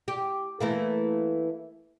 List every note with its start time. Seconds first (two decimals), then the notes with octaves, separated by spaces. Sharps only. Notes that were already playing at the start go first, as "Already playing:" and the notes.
0.08 G4
0.60 E3 A3 A#3